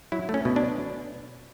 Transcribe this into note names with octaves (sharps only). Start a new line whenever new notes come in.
F#3 E4
A3
C#4
B2
D4